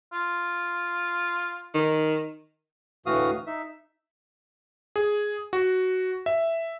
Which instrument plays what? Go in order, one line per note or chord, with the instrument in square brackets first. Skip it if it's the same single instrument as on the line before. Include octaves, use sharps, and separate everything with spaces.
[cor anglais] F4
[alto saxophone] D#3
[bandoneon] D2 A2 E3 F#4 F5 D#6
D#4 E5
[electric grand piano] G#4
F#4
E5